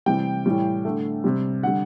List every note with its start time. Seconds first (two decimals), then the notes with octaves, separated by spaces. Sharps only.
0.06 C3 E3 G3 G5
0.46 A2 E3 G3
0.85 D3 A3
1.24 C3 G3
1.63 D3 G3 F#5